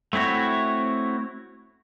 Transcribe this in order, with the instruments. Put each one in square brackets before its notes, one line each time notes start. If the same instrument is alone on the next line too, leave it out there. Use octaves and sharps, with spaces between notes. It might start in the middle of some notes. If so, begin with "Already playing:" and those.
[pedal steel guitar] A3 C4 E4 F#4 C#5